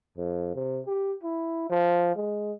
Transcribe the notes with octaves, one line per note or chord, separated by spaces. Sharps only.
F2
C3
G4
E4
F3
G#3